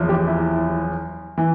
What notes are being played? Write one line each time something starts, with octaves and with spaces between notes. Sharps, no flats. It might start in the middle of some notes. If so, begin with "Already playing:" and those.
Already playing: F#1 E2 F3
G4
E4
E3